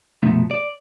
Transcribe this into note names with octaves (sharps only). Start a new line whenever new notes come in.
C2 F#2 B2 F3 A3
D5